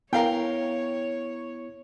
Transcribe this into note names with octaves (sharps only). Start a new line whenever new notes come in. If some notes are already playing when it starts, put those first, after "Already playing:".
B3 E4 A#4 C#5 F5 G5